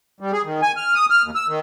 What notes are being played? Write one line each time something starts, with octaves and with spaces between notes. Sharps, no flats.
G3
G#4
D#3
G#5
F6
D#6
F6
D#2
E6
D#3